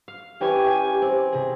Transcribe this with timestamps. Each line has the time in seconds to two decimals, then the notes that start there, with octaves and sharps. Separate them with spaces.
0.08 F5 F6
0.41 E3 C#4 G4 G5 G#5 C#6
0.67 G#5
1.02 C4
1.32 C3 G#4